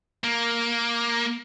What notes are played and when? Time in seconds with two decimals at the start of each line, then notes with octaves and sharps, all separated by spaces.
0.24 A#3